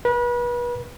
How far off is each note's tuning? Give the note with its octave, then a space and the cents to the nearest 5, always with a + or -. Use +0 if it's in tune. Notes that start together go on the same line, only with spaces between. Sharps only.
B4 -35